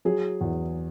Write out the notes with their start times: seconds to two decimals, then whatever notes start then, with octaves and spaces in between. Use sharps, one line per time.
0.05 F#3 G#4
0.41 E2